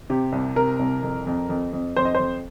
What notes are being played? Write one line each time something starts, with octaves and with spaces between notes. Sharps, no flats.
C3 G4
C2
C3 A#4
C2
F2
F2
F2
F2
F2 C5
D#5
C5
F2